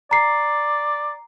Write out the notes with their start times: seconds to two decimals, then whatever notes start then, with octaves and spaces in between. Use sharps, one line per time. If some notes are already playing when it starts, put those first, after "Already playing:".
0.11 D5 A#5 C7